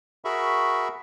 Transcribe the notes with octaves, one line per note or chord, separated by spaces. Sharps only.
F#4 G#4 A#4 E5 B5 C#6